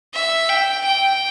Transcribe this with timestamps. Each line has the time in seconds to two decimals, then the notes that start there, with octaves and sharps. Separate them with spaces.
0.14 E5
0.49 G5
0.85 G5